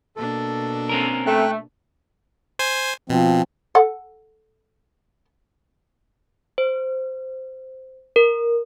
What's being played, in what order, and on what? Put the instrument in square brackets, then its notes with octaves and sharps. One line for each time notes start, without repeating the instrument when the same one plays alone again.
[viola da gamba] B2 A#3 D4 [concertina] A4
[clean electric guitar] C4 C#4 A#4
[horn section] A3 [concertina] G5 F#6
[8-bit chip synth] C5 G#5
[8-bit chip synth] B2 [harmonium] F3 C4
[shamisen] A4 F#5
[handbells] C5
A#4